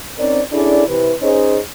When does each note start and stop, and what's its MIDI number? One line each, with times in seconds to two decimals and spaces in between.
0.17 0.40 60
0.17 0.40 61
0.17 0.40 63
0.17 0.40 70
0.17 0.40 72
0.17 0.40 74
0.52 0.86 61
0.52 0.86 62
0.52 0.86 64
0.52 0.86 68
0.52 0.86 69
0.52 0.86 74
0.87 1.11 48
0.87 1.11 52
0.87 1.11 71
1.21 1.58 61
1.21 1.58 63
1.21 1.58 68
1.21 1.58 72
1.21 1.58 73
1.21 1.58 75